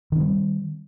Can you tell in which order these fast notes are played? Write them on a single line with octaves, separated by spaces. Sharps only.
D#3 C4 G3